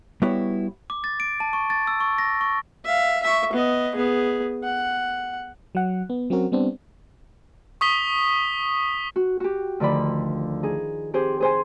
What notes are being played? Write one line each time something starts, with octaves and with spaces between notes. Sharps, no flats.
G3 B3 E4 F#4 B4 C#5
D6
A6
D7
A5
C#6
A6
E6
C#6
A#6
C#6
E5 F5
E5 C#6
B3 D#5
B3 G#4
F#5
F#3 F#5
B3
F#3 C4 C#4 F#4 A#4
G3 B3 C4 D4
C#6 D#6 B6 G7
F#4
F#4 G4
D2 D3 D#3 F3 D5 B5
D#4 G#4
C4 G4 G#4 C5
G#4 C5 G#5